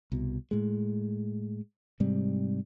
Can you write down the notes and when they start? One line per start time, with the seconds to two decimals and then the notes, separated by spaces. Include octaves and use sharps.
0.12 C2 B2
0.51 A2 G#3
2.00 G#2 C3 G3